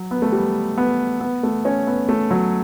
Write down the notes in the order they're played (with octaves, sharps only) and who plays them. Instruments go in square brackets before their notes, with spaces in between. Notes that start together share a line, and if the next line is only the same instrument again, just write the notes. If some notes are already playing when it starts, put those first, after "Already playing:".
Already playing: [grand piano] F#3
B3
A3
G3
B3
B3
A3
C#4
B3
A3
F#3